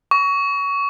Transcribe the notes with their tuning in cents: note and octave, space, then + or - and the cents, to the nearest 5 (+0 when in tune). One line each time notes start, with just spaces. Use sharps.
C#6 +25